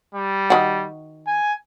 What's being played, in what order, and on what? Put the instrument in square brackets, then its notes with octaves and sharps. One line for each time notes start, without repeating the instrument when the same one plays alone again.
[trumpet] G3
[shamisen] D#3 F#4
[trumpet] G#5